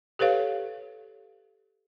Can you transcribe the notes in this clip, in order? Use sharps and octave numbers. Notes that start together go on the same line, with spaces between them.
G4 A4 B4 C#5 F5